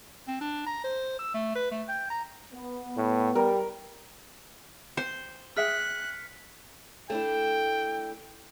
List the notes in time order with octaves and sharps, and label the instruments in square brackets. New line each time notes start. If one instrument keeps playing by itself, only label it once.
[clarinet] C4
D4
A#5
C5
E6
A3
B4
A3
G5
A#5
[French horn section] B3
[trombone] A2
[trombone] G3 [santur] A#4
[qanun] C5 [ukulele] G5
[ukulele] G#4 E5 G5 [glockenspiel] F6 B6 C#7 [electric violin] F#6
[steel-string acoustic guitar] A3 D4 E4 [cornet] G5